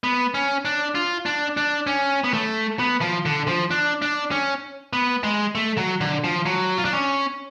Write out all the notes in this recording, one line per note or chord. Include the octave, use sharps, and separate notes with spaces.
B3
C#4
D4
F4
D4
D4
C#4
B3
A3
B3
F3
D3
F3
D4
D4
C#4
B3
G#3
A3
F#3
D3
F3
F#3
F4
D4
C#4